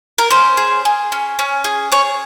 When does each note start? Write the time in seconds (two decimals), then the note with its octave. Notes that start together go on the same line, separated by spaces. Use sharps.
0.18 A#4
0.30 C#4 C5
0.57 G#4
0.85 G#4
1.12 C#4
1.39 C#4
1.64 G#4
1.92 G#4 C#5